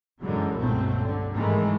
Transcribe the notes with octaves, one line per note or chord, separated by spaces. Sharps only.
F#2 D3 E3 F#3 G#3
G1 C#2 B2 F#3 A3 C4
D3
G#2 C3 D#3 E3 G#3 A3